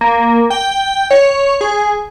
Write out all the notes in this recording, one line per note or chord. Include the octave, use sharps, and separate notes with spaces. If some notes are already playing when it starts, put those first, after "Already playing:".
A#3
G5
C#5
G#4